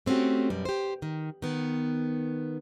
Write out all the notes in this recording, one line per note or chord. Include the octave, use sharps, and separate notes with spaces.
A3 C4 C#4 F#4 G4
F#2 B2 G3
G4 C5
D#3
D#3 B3